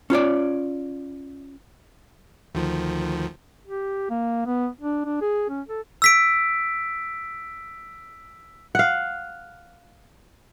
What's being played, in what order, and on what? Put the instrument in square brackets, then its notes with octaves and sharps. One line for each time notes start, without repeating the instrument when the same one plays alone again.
[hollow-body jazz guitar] C#4 F4 C#5 D5
[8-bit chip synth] D2 D#3 F3
[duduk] G4
A#3
B3
D4
D4
G#4
C#4
A4
[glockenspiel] E6 B6 D7
[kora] F5 F#5